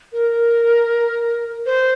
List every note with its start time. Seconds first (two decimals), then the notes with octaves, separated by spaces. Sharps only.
0.13 A#4
1.66 C5